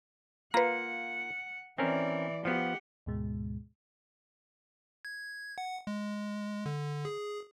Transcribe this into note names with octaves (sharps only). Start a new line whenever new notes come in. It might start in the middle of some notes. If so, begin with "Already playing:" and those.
A#3 F4 B4 F#5 A#5
E3 C4 C#4 A#4 D5
F3 B3 G4 F#5
D2 G#2 B2 G#3
G#6
F#5
G#3
D3
G#4